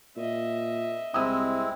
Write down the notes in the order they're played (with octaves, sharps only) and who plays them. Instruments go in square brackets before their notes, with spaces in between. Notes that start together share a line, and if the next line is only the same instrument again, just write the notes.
[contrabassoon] A#2 [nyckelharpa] D#5 E5
[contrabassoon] C2 [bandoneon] G#3 C4 E4 [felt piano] D#6 E6